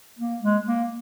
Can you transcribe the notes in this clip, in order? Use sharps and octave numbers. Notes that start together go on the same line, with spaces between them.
A#3
G#3
A#3